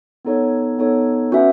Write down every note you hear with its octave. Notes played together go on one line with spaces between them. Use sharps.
B3 D#4 A4 C#5
B3 D#4 A4 C#5
C#4 F#4 B4 E5